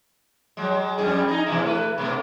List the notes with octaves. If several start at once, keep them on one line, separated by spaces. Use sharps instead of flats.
F#3 G#3
F2 G3 G#4
D#4 G#4
B2 E3 E4
A3 B4
B2 A3 B3